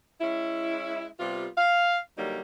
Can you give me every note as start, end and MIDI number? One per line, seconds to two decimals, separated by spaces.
0.21 1.06 56
0.21 1.06 61
0.21 1.06 64
1.20 1.48 48
1.20 1.48 55
1.20 1.48 59
1.20 1.48 65
1.58 1.99 77
2.18 2.41 50
2.18 2.41 54
2.18 2.41 55
2.18 2.41 58
2.18 2.41 63